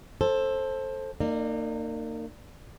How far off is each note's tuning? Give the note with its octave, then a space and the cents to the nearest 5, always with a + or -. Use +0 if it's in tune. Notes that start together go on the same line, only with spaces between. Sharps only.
A4 +0 C5 +20
A#3 -30 D#4 -35 D5 +0